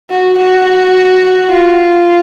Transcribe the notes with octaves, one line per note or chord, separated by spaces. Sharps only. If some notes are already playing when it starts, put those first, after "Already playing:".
F#4
F#4
F4